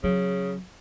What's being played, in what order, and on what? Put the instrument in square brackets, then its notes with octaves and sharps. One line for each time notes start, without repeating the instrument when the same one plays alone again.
[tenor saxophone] C#3 [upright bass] F#3